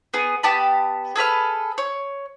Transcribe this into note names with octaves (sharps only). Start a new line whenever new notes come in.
B3 G#4
B3 G4 A5 B5
G#4 A4 B4 F6
C#5